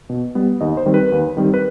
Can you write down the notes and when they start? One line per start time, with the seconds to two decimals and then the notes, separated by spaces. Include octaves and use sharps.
0.09 B2
0.35 G3 B3
0.61 D#2 D#5
0.77 C5
0.86 D#3 G3 C4
0.94 B4
1.12 D#2
1.37 D#3 G3 C4
1.54 B4